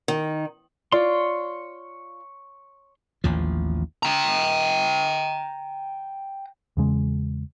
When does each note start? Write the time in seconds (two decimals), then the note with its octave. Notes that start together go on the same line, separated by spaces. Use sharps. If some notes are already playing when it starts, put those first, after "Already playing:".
0.08 D#3
0.92 F4 C#5 D5 C6
3.24 A1 D#2 F3
4.03 G5 A#5
6.77 E2 C#3 G#3